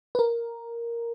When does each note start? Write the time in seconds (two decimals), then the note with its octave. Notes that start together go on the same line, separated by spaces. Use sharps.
0.15 B4
0.19 A#4